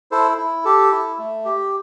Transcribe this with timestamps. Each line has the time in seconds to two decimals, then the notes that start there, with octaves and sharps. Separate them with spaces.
0.11 E4 A4 C5
0.38 E4
0.64 G4 A4
0.91 E4
1.18 A3
1.45 G4